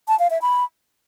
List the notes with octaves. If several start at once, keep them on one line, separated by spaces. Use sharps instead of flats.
A5
F5
E5
B5